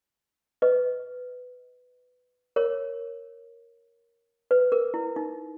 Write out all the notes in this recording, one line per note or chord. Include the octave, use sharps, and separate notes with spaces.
B4 D#5
A#4 C#5
B4
A#4
E4
D#4